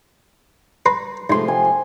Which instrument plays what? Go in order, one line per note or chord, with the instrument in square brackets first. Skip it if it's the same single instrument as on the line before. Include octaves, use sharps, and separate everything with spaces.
[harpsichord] B4 A#5 C6
[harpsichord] G#2 C6 [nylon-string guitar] C3 F3 A3
[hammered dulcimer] G#5